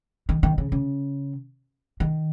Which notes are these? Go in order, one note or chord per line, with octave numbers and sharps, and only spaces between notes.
D#3
D#3
C#3
C#3
D#3